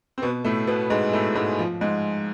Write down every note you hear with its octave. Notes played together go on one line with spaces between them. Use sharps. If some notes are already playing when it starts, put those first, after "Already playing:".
C4
B2 B3
A2 A3
B2 B3
G#2 G#3
A2 A3
G#2 G#3
F3
G#2 G#3